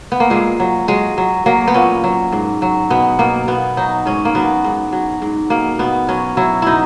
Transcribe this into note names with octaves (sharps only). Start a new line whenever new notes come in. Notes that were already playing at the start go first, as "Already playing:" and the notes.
B3
A#3
A#2 G#3
F#3
F#3 G#3
F#3
F#3 A#3
B3
A#2 C#4
F#3
G#2
F#3
B2 B3
B2 A#3
B2 B3
F#3 D#4
G#2 C#4
A#3
F#3 B3
G#2
F#3
G#2
B2 A#3
B2 B3
F#3 C#4
F#3 E4
B2 D#4 E4